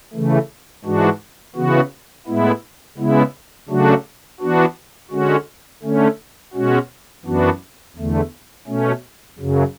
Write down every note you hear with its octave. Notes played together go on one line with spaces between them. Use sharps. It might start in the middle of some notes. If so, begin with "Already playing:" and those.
C#3 E3 A3
G#2 E3 G#3 D4 F#4
C#3 E3 B3 F#4
A2 G#3 B3 E4
C#3 G#3 B3 E4
C#3 F#3 A3 D4 F#4
E3 B3 D4 F#4
D3 G#3 C#4 F#4
D3 A3 C#4
B2 G#3 C#4 F#4
F#2 E3 B3 D4 F#4
E2 D3 A3
B2 A3 C#4
F#2 C#3 F#3